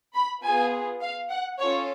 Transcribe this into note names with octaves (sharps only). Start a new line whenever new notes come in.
B5
B3 F4 G#4 G#5
F5
F#5
C#4 F4 A4 C#5